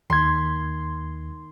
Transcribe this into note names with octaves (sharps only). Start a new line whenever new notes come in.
D#2 D#3 C6 G#6 B6